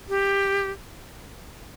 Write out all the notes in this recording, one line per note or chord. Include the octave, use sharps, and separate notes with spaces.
G4